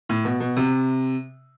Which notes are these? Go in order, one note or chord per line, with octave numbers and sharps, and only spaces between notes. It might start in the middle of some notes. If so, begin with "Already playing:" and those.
A2
B2
B2
C3